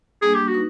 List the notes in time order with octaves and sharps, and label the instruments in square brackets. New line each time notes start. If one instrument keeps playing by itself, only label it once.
[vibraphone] G3 A#3 D4 [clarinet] G#4
[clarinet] G4
F#4
[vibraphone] D#4 B4